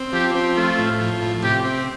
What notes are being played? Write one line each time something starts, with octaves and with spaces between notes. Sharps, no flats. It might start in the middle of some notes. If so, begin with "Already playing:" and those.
Already playing: C4
F3 G4
C4
A3 F4
A2
F3
A2
C3 G4
C4